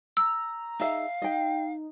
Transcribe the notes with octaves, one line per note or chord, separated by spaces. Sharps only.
A#5 E6
D#4 G#4 E5 F5
D#4 D#5 G5